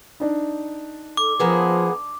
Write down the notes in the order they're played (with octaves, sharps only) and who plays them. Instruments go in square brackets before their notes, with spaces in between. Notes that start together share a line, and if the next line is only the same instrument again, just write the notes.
[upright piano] D4 D#4
[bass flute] A4 [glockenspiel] D6
[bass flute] F3 [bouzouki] A#3 B3 G#4